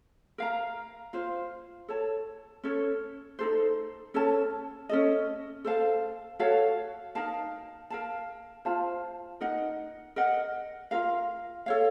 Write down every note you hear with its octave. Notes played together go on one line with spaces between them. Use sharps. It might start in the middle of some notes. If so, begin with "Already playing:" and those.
A#4 F5 A#5
F4 C5 F5
A4 C#5 A5
C#4 A4 C#5
D#4 F#4 A4 C5
C#4 A4 C#5 A5
C#4 A4 D#5
A4 C5 F5 A5
F#4 A4 C#5 F5
D#4 A#4 F5 A5
A#4 F5 A5
F4 C5 F5 A5
D#4 A#4 D#5 F#5
A#4 D#5 F#5
F4 A#4 F5
A4 C#5 F5